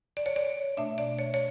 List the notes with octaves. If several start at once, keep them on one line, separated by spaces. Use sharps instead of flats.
D5
C#5
D5
B2 A3 D4 E5
D5
C#5
C#5